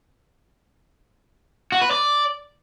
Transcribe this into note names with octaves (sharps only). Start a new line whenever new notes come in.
F#4
B4
D5